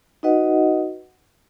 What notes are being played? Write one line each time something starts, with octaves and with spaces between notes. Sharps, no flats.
D#4 F#4 B4 D#5 F#5